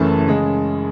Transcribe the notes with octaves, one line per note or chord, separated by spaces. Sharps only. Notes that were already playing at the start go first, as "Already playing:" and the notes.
Already playing: F#1 F#2 E3 A3 A5
C#3 G#3